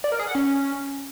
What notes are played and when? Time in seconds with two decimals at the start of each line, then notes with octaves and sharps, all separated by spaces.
0.04 D5
0.12 A#4
0.19 G#4
0.27 F#5
0.35 C#4